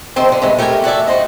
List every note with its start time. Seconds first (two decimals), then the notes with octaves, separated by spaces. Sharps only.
0.16 C3 D#3 C4 A4 C5 G5
0.29 F2 D3
0.42 G2 C3 G#3 A3
0.58 A3 G4 A#4 F#5 G#5
0.84 F#4 A4 D5 E5
1.07 F#4 C5 D#5